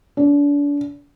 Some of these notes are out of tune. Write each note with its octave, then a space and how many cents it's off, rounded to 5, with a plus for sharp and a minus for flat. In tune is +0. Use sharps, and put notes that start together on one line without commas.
D4 -35